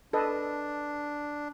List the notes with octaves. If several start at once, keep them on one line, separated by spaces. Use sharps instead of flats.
D4 A4 B4 D#5